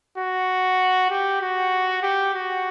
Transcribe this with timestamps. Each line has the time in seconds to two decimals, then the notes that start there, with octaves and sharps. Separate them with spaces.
0.18 F#4
1.10 G4
1.41 F#4
2.03 G4
2.34 F#4